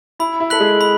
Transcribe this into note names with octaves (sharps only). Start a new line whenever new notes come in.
E4 B5
E4
A4 F#6 B6 F#7
G#3 G#4
B5